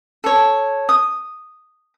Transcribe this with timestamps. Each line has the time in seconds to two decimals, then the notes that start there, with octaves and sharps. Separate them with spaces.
0.24 A4 C#5
0.89 D#6